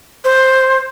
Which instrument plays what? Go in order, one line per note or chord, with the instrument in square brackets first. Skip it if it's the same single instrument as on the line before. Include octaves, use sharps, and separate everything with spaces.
[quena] C5